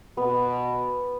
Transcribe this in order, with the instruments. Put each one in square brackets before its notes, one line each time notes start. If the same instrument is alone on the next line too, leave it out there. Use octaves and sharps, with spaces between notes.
[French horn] B2 [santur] B3